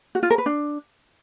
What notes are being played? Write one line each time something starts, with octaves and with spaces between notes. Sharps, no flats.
F#4
F4
A#4
B4
D4